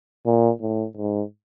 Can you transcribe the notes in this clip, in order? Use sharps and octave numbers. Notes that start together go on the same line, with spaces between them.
A#2
A2
G#2